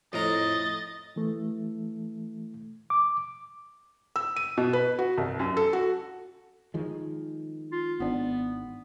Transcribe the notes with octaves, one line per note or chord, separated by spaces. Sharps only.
F2 A2 D#5 A#5 A6
E3 A3
D6
E6
D#7
B2
B4
F#4
C2
F#2
A4
F#4
D#3 F3 G#3
F4
G#1 B3 C#4 D4